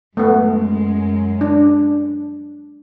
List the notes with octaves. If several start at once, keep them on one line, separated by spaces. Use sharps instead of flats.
F#2 G#3 A3 B3
D4